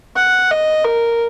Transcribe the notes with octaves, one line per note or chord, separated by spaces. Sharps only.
F#5
D#5
A#4